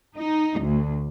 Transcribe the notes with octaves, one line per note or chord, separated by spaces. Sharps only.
D#4
D2